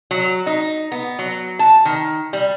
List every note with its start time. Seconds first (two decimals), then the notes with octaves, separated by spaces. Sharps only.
0.11 F#3
0.46 D#4
0.92 B3
1.19 F#3
1.59 A5
1.85 D#3
2.33 G3